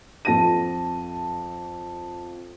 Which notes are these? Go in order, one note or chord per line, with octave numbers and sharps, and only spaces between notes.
F2 A5 A#6 D#7